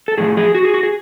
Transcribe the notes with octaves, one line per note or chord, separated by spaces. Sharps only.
A4
A2 F3 G#4
G#4
F#4
G#4
F#4
G#4